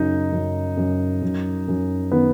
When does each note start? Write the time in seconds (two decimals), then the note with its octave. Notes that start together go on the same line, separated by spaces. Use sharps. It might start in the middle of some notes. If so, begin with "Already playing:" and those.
Already playing: F#2 C#3 D#4
0.33 F#2
0.77 F#2
1.22 F#2
1.68 F#2
2.12 D#3 B3